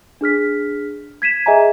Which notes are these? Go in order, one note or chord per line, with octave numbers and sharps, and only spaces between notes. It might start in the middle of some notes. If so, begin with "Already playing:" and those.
D4 G#4 F6 B6
G#6 B6 D#7 E7
G#4 D#5 E5 G#5 A#5